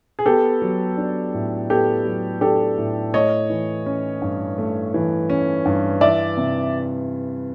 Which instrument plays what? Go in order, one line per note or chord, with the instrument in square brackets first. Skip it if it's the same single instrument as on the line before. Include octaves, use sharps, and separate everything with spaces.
[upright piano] G#4
[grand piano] B3 [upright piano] G4 A4
[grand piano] F#3
D4
A2
[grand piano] B3 [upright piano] G4 A4
[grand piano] F#3
[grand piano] D4 [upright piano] G4 A4
[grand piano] A2
[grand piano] A3 [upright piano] C#5 D#5
[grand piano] E3
C#4
G2
A3
E3
C#4
G2
[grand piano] E3 [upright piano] D5 E5
[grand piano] C3